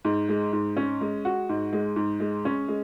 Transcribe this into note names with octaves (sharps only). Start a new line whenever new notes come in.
G#2
G#3
G#2
C#4
G#3
F#4
G#2
G#3
G#2
G#3
C#4
G#3